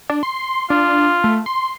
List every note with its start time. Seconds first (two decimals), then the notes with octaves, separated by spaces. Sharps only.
0.10 D4
0.23 C6
0.70 D4 F4
1.24 A3
1.46 C6